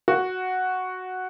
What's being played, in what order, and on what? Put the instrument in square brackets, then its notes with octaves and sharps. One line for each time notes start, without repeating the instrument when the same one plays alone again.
[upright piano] F#4